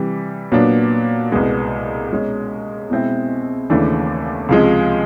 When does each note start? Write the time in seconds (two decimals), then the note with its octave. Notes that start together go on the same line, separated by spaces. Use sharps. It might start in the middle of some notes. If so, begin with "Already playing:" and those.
Already playing: C3 E3 G3
0.52 A#2 F#3 B3 D4
1.32 C2 B2 G#3 B3
2.11 B2 G#3 C#4
2.90 B2 G#3 C4 E4
3.70 D#2 C#3 E3 A3 D4
4.49 C#2 C3 F3 G#3